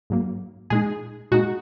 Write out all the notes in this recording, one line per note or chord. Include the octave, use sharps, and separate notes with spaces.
G#2 F#3 A#3
A#2 G#3 D#4 G#4
A#2 G#3 D#4 F#4